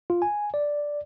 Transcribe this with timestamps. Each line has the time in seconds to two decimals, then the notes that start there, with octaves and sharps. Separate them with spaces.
0.10 F4
0.22 G#5
0.54 D5